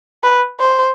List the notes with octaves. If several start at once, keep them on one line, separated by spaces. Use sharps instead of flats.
B4
C5